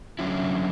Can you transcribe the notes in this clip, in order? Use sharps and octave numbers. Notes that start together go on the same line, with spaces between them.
D3 F#3 C#4 E4